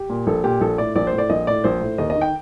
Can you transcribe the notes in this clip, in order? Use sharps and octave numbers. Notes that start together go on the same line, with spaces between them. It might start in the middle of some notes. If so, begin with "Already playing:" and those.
Already playing: G4
A#2
A#1 A4
A#2 G4
A#1 A4
A2 D5
A#1 D5
C5
A2
D5
A#1 D#5
A2 D5
A#1 C5
A2
D#2 D#5
D#5
D#3
G5